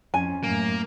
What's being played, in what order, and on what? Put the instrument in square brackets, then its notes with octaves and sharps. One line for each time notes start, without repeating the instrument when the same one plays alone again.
[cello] F2 C#4 [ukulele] G#5
[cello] F#2 A2 [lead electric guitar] A#3